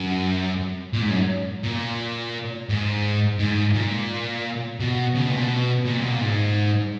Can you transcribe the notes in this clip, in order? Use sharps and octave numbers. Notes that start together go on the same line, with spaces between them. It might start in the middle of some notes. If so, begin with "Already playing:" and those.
Already playing: F#2
A#2
G#2
F#2
A#2
G#2
G#2
A#2
B2
C#3
B2
A#2
B2
A#2
B2
A#2
G#2